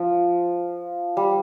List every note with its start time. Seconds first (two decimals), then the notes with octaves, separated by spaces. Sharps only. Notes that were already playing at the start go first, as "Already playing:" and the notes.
Already playing: F3
1.17 G3